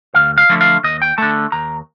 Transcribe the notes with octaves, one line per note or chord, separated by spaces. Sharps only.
D2 F5
F5
D3 F3 A3
F5
D#2 D#5
G5
D3 A3 A5
D#2 A#5